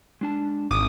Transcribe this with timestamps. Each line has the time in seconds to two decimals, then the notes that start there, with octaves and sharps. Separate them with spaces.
0.21 G#3 D4 A5
0.71 G#1 D6 D#6 D#7